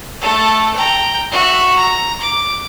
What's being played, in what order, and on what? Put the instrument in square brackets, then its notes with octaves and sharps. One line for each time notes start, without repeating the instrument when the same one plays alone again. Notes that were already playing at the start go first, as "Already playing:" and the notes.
[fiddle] A3 A4
G5 A#5
F#4 E5
A#5
D6